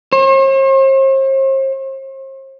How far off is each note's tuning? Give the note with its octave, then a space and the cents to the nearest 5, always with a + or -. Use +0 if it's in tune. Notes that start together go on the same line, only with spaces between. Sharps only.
C5 +45